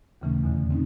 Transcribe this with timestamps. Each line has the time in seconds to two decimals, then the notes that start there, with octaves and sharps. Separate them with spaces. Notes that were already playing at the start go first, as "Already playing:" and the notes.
0.21 D#2 A#2 C#3 E3 A3 C#4
0.44 E2 B2 D3
0.71 C4 C#4 D#4